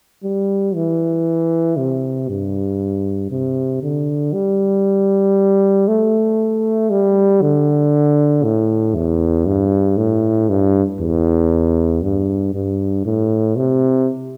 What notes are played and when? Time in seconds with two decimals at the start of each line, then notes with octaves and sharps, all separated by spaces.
0.24 G3
0.75 E3
1.77 C3
2.29 G2
3.31 C3
3.83 D3
4.34 G3
5.88 A3
6.90 G3
7.42 D3
8.44 A2
8.95 E2
9.46 G2
9.98 A2
10.49 G2
11.00 E2
12.03 G2
12.54 G2
13.05 A2
13.56 C3